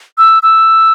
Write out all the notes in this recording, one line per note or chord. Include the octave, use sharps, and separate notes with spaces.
E6
E6